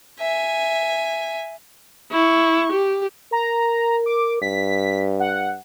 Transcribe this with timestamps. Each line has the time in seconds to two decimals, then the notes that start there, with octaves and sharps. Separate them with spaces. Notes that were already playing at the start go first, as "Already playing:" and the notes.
0.19 E5 G#5
2.11 E4 C#6
2.73 G4
3.32 A#4 A#5
4.06 D6
4.42 G2 B6
5.20 F#5